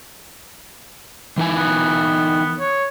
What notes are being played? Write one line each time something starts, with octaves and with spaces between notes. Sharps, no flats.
E3 D#4 G#5
B3
C#5